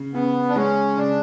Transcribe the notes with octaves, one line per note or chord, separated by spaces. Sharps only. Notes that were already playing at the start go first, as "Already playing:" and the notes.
Already playing: C#3
C#3 B3
D4
G#3 C#4
C#3 D4